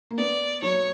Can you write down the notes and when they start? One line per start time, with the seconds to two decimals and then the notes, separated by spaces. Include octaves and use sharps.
0.11 A#3
0.18 B3 D5
0.62 F#3 C#5